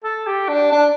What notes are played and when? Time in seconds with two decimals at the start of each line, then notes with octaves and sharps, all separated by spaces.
0.04 A4
0.26 G4
0.48 D4
0.72 D4